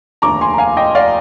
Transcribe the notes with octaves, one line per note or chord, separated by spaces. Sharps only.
F1 D#2 D3 A#5 D6
G#5 C6
A#5
F5 G#5
D#5 G5
D5 F5